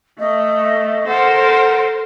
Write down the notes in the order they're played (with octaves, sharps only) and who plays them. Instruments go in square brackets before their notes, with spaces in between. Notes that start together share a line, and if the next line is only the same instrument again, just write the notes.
[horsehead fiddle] A3 [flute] D#5
[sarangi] A4 [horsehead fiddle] A#4 C5 [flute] F#5